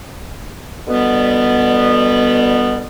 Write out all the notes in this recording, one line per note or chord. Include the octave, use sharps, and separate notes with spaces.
B2 D3 G3 B3